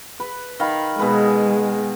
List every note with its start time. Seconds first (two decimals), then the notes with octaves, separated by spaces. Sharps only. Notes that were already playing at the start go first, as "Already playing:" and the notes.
0.20 B4
0.60 D#3 F5 B5
0.99 B2 G#3 G#4 B4